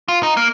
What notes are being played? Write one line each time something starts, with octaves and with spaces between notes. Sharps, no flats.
F4
D#4
A#3